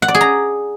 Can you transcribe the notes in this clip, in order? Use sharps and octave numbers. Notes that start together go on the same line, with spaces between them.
F#5
D5
G#4
A#5